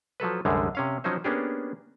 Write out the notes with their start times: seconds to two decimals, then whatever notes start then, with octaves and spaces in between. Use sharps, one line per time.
0.20 F3 F#3 A4 B4
0.45 C2 F#2 D3 G3 G#3
0.75 C3 C#4 F5
1.04 F3 F#3 C#4 D#4 C5
1.24 A#3 B3 C#4 D4 G4 G#4